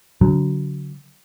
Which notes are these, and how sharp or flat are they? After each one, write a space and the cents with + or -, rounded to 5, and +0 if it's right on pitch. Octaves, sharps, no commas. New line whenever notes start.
D3 -35 F#3 +0